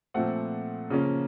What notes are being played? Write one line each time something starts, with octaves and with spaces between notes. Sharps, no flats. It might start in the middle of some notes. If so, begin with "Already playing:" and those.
A#2 F3 A3 C4 F#5
C#3 F3 A#3 C#4